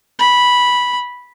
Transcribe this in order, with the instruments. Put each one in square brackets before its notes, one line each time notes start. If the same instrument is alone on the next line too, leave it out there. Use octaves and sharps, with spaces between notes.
[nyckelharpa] B5